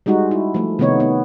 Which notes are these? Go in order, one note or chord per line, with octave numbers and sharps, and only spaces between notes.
G3 G#3 D#4 F#4
E4
F3 A3
C3 D#3 A3 B3 D#4 C#5
B3